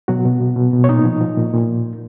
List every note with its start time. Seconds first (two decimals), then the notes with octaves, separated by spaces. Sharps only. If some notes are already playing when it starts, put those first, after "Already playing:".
0.08 B2 F#3 F#4
0.25 B2
0.40 B2
0.56 B2
0.73 B2
0.84 C#5
0.89 A#2 D#4 D#5
1.05 F3
1.20 F3
1.37 A#2
1.53 A#2